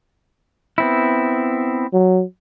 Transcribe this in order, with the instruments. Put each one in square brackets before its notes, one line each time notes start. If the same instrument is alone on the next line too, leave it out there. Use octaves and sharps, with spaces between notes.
[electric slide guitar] B3 C4 E4
[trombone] F#3